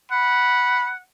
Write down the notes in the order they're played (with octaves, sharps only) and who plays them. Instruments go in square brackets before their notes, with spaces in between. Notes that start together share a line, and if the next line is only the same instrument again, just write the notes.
[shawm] F#5 [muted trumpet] B5